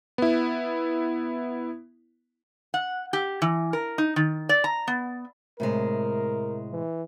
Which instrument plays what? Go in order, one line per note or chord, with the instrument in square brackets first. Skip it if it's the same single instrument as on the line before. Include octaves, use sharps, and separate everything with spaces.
[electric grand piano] B3 E4
[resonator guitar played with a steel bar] F#5
G4
E3
A#4
D#4
D#3
D5
A#5
B3
[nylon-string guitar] A2 C3 G#3 [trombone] A#4
[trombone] E3